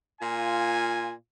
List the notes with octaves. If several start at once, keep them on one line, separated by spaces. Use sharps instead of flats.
A#2 F4 G#5